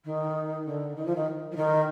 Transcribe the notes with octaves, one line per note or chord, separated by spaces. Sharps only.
D#3
D3
D#3
F3
D#3
F3
D#3